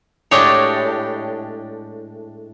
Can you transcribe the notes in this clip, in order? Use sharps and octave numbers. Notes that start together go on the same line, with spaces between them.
A2 G#3 D4 G4 C#5